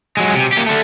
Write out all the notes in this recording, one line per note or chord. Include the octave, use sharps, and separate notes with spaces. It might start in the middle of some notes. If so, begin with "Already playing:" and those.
F#3 G#3
C3
A#2 G4
D3 A3